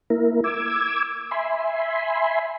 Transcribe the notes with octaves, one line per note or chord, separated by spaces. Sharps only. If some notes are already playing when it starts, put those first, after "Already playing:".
A#3 E4 A#4
D6 E6 G#6
E5 G#5 B5 C6